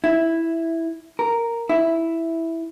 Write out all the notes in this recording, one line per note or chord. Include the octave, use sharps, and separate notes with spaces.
E4
A#4
E4